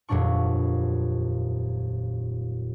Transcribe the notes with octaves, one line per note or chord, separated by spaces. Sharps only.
D#1 F2 A#2 F#3 D4 C#6